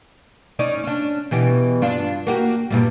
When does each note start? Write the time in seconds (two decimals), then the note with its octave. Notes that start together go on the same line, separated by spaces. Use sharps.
0.59 C#4 D#4 D5
0.84 C#4 D4
1.31 B2 E3 G4
1.82 G2 D4 F4
2.27 A#3 F#4 G4
2.70 G2 A#2 G3